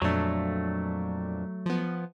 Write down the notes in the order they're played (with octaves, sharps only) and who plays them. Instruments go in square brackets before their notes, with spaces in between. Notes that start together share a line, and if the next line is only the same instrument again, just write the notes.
[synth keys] F2 A#2 D4 [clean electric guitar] F#3 A3
[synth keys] F3 B3